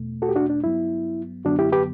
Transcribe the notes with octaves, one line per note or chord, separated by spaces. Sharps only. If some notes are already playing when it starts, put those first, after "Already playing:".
Already playing: E2 B2 A3
F#4 A4
G4
D4 F#4
D4
G2 F#3 B3 E4
F#2 D3 F#3 B3 D4 F#4
E4 G4
G4 B4